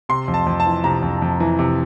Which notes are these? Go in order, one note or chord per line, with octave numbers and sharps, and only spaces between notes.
C3 C6
F2
A5
F2
A5
E3
C3 A#5
F2
F2
E3
C3